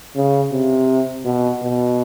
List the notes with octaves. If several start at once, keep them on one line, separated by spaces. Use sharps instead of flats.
C#3
C3
B2
B2